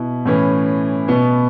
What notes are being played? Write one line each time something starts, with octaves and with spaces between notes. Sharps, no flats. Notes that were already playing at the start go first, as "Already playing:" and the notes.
Already playing: B2 E4
A2 E3 C#4
B2 B3